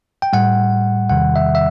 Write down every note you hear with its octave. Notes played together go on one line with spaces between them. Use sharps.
G5
A2 G3 F#5
E2 C3 D#3 G3 F#5
E5
E5